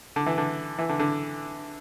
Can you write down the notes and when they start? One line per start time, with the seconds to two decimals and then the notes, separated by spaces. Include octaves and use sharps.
0.16 D3
0.26 E3
0.38 D3
0.78 E3
0.89 D3
0.99 D3